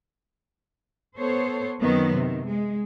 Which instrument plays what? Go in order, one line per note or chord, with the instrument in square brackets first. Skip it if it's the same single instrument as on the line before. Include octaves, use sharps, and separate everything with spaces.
[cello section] B3 A4 C5 C#5
F#2 D#3 F#3 B3 C4
C3 D#3
G#3